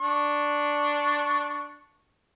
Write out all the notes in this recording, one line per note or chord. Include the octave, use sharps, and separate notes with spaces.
D4 C#6